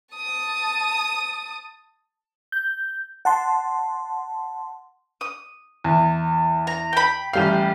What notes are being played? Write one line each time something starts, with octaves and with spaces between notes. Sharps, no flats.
A5 D#6
G6
F#5 A5 C6
D#6
E2
A#5
G5 B5
A1 G3 F5 G5